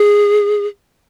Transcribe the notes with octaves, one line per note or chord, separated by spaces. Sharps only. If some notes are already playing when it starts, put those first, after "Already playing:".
Already playing: G#4